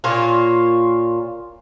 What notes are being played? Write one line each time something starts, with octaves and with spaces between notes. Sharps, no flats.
A#2 A#3 F4 C#5